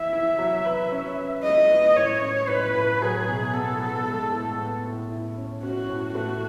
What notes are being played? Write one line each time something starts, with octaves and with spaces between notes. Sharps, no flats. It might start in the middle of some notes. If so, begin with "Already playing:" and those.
Already playing: E3 E4 E5
E4
F#3
B4
C#4
B4
G#3 D#5
B4
A2 C#5
C#4
A2 B4
A2
F#3 G#4
B2
B3 A4
B3
G#3
A2
B3
A2
E4
C#4
C#4 F#4
A2
A3 F#4